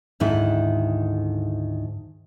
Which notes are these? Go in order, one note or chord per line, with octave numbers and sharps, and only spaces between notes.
D2 G#2 D#3 E4